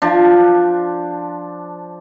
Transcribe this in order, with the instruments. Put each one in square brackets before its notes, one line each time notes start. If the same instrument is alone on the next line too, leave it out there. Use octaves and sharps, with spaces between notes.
[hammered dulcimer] F3 D4